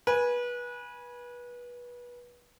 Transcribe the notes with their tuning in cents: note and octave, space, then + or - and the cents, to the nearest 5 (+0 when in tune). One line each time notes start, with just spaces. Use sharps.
B4 -25 G#5 +0